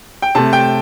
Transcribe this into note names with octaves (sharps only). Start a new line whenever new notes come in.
G5
C3 A3 A5
G5